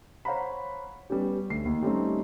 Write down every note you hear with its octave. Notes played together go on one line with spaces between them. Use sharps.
C5 C#5 F5 F#5 A#5 B5
G3 B3 C#4 G4
D2 C7
D#2
G3 A3 C4 C#4 D#4